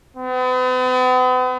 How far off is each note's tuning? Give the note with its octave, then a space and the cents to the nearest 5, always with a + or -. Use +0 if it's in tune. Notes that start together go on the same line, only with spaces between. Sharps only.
B3 +45